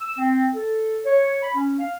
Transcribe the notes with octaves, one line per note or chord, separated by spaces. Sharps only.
E6
C4
A4
C#5
B5
C#4
F5